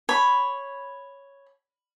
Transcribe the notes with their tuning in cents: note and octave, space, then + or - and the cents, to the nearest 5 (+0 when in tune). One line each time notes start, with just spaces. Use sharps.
C#5 +0 B5 +0